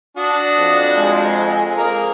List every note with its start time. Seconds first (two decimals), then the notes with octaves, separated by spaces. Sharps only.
0.17 D4 F#4 D#6
0.59 F2
0.97 G#3 G#5
1.78 A#3 G#4 A#4